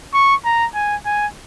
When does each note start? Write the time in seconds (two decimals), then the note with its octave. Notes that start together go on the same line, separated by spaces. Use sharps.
0.14 C#6
0.45 A#5
0.75 G#5
1.06 G#5